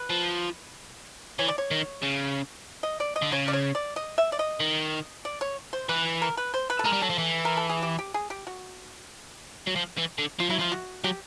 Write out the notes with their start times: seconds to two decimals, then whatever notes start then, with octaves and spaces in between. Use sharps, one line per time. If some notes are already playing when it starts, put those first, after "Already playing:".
Already playing: B4
0.10 F3
1.39 E3 C#5
1.48 D5
1.58 C#5
1.71 D#3
2.03 C#3
2.83 D#5
3.00 D5
3.16 D#5
3.22 D3
3.32 C#3 C#5
3.48 D5
3.53 C#5
3.75 D5
3.96 D#5
4.18 E5
4.32 D5
4.39 D#5
4.60 D#3
5.25 D5
5.41 C#5
5.73 C5
5.89 E3 B4
6.22 A#4
6.37 B4
6.54 C5
6.70 B4
6.79 A4
6.85 G#3 A#4
6.93 G3
7.02 F#3 A4
7.10 F3
7.18 E3
7.45 A#4
7.57 A4
7.69 G#4
7.82 G4
7.99 G4
8.14 G#4
8.30 G4
8.47 F#4
9.67 F#3
9.76 F3
9.97 E3
10.18 D3
10.39 F3 F4
10.49 F#3 E4
10.59 F3 F4
10.72 F#4
11.04 F#3 G4